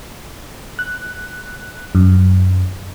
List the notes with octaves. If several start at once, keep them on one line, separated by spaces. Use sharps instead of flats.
F#6
F#2